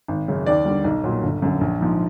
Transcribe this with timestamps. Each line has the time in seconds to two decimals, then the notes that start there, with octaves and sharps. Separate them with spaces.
0.08 G#1
0.28 F#2 C#3
0.46 D#2 D5
0.65 D3 G3
0.84 B1
1.04 A#2 F#3
1.23 G1
1.42 F#2 D3
1.61 A#1
1.80 G#2 F3